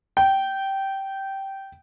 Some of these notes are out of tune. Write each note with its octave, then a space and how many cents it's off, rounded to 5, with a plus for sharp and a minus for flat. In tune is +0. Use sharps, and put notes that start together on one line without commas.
G5 -15